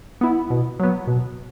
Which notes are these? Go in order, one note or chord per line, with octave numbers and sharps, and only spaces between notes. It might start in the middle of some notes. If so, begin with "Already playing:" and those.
B3 E4
B2
F#3 B3
B2